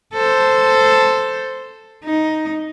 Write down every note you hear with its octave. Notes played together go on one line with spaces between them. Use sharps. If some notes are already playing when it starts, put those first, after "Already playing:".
A4 C5
D#4